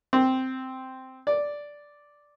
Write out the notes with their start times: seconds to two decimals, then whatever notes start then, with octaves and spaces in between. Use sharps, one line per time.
0.13 C4
1.27 D5